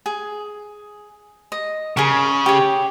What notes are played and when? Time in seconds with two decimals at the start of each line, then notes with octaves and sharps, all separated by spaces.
0.06 G#4
1.52 D#5
1.97 C#3 G#4 A#4
2.46 G4 C#5